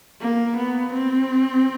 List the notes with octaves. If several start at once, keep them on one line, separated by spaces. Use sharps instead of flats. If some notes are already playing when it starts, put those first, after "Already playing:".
A#3
B3
C4